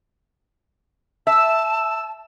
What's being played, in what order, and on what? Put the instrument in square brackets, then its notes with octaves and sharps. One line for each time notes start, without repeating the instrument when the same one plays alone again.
[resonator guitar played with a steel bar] E5 [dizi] A5 [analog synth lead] E6